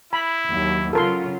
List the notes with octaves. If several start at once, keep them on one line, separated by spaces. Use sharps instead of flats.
E4 B5
D#2 F#3
C#3 F#3 F4 A4 A#4 C6